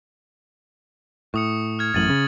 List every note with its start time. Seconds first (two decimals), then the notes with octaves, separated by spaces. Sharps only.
1.34 A2 C#6 D#6 C#7
1.79 F6 G#6
1.94 A1 F#2 A2 A6 D#7 F#7
2.10 C#3